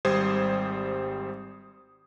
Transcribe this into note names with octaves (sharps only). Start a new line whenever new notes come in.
G#1 G3 C5 D#6 G#6